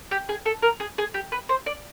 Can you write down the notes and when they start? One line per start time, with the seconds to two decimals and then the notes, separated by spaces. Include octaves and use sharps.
0.11 G4
0.29 G#4
0.45 A4
0.62 A#4
0.80 G#4
0.98 G#4
1.14 G4
1.32 B4
1.49 C5
1.66 D5